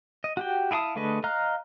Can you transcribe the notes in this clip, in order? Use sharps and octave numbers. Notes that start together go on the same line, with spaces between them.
D#5
F#4 G4 G5
E4 G#4 F5 A5 D#6
D3 A3 G#4 B4 D#5
D#5 F5 A#5 F6 F#6